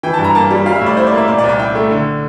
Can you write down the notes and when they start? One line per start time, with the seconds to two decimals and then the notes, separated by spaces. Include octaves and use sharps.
0.03 E3 G5
0.13 A5
0.18 G2
0.24 A#5
0.35 A#3 A5
0.50 G3
0.66 G3 F5
0.75 E5
0.81 A2
0.86 D5
0.97 E4 C5
1.07 D5
1.12 A#3
1.18 E5
1.28 A#2 D5
1.38 D5
1.44 C2
1.49 D5
1.59 E4 G5
1.75 A3
1.91 D3